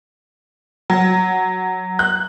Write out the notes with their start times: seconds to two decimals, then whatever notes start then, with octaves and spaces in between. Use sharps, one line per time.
0.90 F#3
1.99 F#6